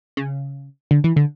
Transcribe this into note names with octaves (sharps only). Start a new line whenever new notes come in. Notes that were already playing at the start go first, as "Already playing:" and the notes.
C#3
D3
E3
D3